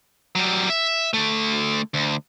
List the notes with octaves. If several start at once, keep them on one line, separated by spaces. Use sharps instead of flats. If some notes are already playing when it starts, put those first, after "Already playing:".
F#3 G3
E5
D3 A3
D2